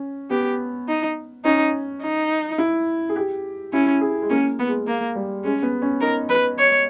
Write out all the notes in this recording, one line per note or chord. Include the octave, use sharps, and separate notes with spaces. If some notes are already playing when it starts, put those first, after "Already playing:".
Already playing: C#4
B3 G4
D#4
C#4 D#4
D#4
E4
G#4
G4
C#4 E4
G#4
G#3
A#3 C#4
B3
G#3
A#3
G3
G#3 C#4
B3
C#4
D#4 A#4
B4
C#5